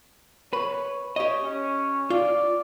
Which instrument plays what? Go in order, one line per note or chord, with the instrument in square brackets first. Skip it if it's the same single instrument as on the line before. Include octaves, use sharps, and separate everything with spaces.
[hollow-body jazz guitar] B4 [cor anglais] C#5
[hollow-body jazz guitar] G4 D#5 [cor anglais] C#5
[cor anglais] C#4
[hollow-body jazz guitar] F4 [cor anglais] D5